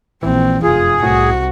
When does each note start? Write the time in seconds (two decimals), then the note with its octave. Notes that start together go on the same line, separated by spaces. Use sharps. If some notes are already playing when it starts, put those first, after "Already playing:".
0.23 A#1 A#2 E3 C4
0.63 F1 F#2 F4 G#4
1.03 C2 A2 C3 F#4